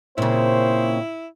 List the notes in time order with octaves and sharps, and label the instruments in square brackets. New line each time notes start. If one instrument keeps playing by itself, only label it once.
[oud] A#2 C#3 [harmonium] A#3 C4 C#5 [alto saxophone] E4 [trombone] C5